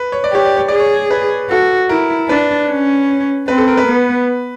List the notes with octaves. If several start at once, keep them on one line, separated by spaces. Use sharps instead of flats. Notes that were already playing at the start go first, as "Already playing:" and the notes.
Already playing: B4
C#5
D5
G4 C#5
D5
C#5
G#4 D5
C#5
B4
F#4 A4
E4 A#4
D4 B4
C#4
C4 B4
A4
A#4
B4
B3